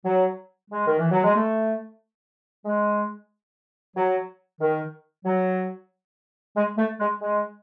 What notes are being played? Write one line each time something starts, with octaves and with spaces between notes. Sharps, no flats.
F#3
G#3
D#3
E3
F#3
G#3
A3
G#3
F#3
D#3
F#3
G#3
A3
G#3
G#3